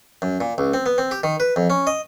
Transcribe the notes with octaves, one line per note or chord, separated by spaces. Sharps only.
F#2
A#2
C#2
C4
B3
C4
G4
D#3
B4
F2
C#4
D#5